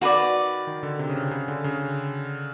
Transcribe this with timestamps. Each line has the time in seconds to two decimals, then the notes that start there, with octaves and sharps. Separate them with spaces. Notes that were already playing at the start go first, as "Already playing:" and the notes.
0.01 D#3 F#4 B4 D5
0.67 D#3
0.83 D3
0.99 C3
1.09 C#3
1.15 C3
1.31 C#3
1.48 D3
1.64 C#3